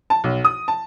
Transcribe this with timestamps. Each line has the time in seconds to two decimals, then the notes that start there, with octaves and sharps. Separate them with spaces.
0.10 A5
0.24 B1
0.45 D#6
0.68 A5